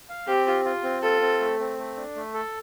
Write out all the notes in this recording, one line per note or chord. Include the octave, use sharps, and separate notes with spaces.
F5
C4 G4
F4
F4
C4
F4 A4
C4
A3
C4
A3
D4
A3
A4